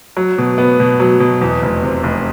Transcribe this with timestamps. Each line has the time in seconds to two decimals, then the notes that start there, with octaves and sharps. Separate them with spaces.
0.17 F#3
0.38 B2
0.58 B3
0.80 B2
1.00 F#3
1.20 B2
1.42 E2
1.62 F1
1.83 C3
2.03 F1